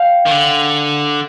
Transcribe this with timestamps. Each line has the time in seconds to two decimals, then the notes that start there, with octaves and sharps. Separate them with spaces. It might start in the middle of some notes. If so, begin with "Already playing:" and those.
Already playing: F5 G5
0.26 D#3
0.31 D3